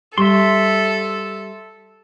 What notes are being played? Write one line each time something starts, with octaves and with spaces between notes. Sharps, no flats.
G3 A4 E5 C6